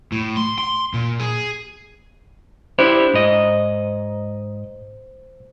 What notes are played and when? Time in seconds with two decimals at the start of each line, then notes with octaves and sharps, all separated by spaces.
0.12 A2
0.37 C6
0.58 C6
0.94 A#2
1.20 G#4
2.79 D4 E4 G4 C5
3.14 G#2 D#5